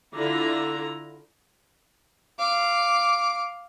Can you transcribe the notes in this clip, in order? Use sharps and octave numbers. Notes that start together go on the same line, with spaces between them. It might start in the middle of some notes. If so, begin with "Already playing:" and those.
D3 E4 F4 A#5
F5 D6